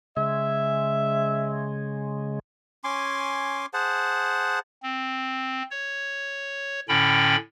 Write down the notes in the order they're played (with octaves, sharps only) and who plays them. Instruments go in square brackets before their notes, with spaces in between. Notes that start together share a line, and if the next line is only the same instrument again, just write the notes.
[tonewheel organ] C#3 G#3 [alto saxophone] E5
[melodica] C#4 G#5 C6 D6
G#4 C5 F#5 A5
[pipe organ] C4
C#5
A2 D3 C#4 G5 B5